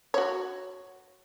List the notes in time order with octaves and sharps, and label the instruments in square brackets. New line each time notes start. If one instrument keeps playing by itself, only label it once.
[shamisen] F#4 C#5